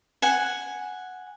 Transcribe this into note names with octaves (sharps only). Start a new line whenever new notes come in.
F#5 G#5